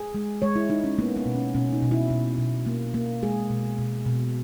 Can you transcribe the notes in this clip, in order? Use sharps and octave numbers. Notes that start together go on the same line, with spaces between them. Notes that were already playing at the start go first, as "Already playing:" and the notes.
Already playing: G#4
G#3
G#3 C#5
E4
G#3 D#4
C#4
A#3 B3
B3
B2
C#4
B2 C#4
D#4
B2
E4
B2
B2
A#3
A#3
G#3 G#4
B2
B2
B2